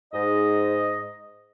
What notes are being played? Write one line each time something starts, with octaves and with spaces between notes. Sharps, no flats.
G#2 D#5